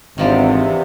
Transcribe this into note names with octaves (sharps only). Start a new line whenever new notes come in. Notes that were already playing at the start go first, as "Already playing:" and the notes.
G#1 E2 C3 D#3 F3 D4